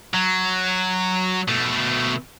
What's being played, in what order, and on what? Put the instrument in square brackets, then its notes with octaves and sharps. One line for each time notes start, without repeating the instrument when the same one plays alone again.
[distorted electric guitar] F#3
B2 A3